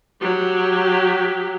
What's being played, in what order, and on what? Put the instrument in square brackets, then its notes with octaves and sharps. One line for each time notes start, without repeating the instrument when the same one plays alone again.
[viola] F#3 G4